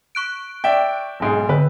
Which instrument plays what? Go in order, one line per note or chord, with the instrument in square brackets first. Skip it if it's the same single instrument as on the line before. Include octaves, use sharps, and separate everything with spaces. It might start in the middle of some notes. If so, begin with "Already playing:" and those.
[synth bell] C#6 F#6 D7
[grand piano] D5 E5 G5
B1 G#2 G#4
[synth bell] D3 [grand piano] B4